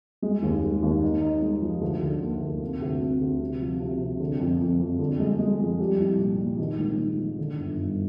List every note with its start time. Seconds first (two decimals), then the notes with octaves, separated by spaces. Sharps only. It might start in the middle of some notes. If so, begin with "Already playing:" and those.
0.22 G#3
0.42 D#2
0.62 G#3
0.82 D#2
1.02 D#4
1.22 D#4
1.42 G#3
1.62 F3
1.81 D2
2.02 D3
2.22 A#3
2.41 D2
2.61 C3
2.82 D2
3.01 C4
3.21 D2
3.40 C3
3.61 F3
3.81 C3
4.00 C3
4.20 D3
4.40 F2
4.60 F2
4.80 F2
4.99 D3
5.19 G#3
5.39 G#3
5.59 F2
5.80 G3
5.99 C2
6.19 A#2
6.39 A#2
6.59 D#3
6.78 G#2
6.99 G#2
7.18 D#3
7.38 D3
7.58 G1
7.78 G2